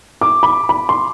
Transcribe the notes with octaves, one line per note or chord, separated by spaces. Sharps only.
D6
B5
B5
C6